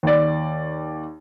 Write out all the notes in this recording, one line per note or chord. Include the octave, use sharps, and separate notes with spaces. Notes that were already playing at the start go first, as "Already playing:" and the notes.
D#2 D5